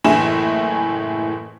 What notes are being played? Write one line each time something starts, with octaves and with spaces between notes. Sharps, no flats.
F#1 A2 E3 E4 G#4 E7